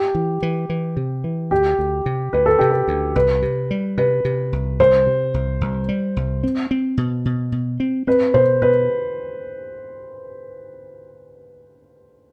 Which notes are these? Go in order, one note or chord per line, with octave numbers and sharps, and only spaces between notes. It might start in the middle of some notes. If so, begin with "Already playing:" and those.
Already playing: G4
E3
E3
E3
C3
E3
D2 G4
D2
C3
D2 B4
A4
C3 G4
A4
D2
C2 B4
C3
G3
C3 B4
C3
C2
C2 C5
C3
C2
C2
G3
C2
C4
C4
B2
B2
B2
C4
C4 B4
B2 C5
B2 B4